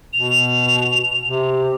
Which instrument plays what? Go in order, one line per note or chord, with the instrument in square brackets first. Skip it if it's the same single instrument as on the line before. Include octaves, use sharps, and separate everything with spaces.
[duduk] B2 [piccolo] F7
[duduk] C3